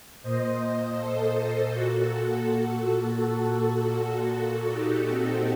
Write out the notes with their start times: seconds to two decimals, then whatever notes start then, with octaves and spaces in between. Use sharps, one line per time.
0.22 A#2 C5 D#5
0.97 A4 C5
1.72 A#2 F#4 A4
3.21 A#2
4.71 A#2 D#4 G4
5.08 C4 D#4